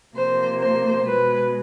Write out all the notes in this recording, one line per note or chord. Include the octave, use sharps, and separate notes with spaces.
C3 F3 A#3 C5
C5
B2 G#3 B4